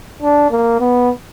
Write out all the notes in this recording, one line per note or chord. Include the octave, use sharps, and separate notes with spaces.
D4
A#3
B3